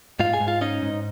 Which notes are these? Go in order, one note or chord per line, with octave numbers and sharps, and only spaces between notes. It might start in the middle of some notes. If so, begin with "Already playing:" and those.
G#2 F4 F5
G#4 G#5
G#2
F4 F5
C#4 D#4 D#5
G#2